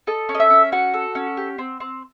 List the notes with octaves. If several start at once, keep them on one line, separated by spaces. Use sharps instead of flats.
A4 D#5
C#4
D#5
E5
C#4
F#4 F#5
A4
C#4
G4
C4
C4